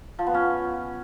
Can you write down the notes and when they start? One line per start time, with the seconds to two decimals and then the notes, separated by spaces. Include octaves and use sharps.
0.19 F3
0.27 B3
0.34 C#4